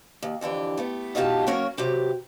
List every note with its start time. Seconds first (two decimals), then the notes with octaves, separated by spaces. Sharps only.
0.22 D#2
0.41 F2 D3 E3 G4
0.77 A3 B3 G4
1.15 B2 D#4 F4 G4 D5 A5
1.47 F#3 A#3 C#4 F#4 A#4 C#5
1.77 C3 F#3 G4 B4